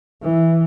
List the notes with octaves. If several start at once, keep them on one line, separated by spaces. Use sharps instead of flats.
E3